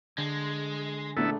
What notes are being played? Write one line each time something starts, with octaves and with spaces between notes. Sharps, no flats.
D3 G#3
A#1 A3 B3 D4 E4 A4